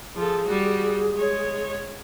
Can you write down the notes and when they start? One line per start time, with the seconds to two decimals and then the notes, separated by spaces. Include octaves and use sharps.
0.16 F3 G#4 A4
0.46 G3 F#4
1.14 G#3 C#5